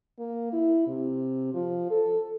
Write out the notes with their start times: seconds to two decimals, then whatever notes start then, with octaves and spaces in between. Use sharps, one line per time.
0.19 A#3
0.53 E4
0.87 C3
1.54 F3
1.90 A4